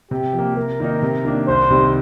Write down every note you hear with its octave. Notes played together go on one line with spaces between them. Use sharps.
C3 G4
F3
A#3
C3 A#4
D#3 A#3 D#4
C3
D#3 A#3 D4
C2 C5
C3 D#3 G3